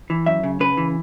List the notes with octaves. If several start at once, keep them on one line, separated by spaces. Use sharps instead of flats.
E3
F#2 E5
C#3
C#3 B4
E3